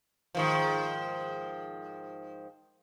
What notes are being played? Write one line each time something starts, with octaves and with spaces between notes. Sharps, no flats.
G#2 D#3 F3